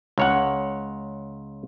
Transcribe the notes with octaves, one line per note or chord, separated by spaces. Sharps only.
C#2 C#5 F#5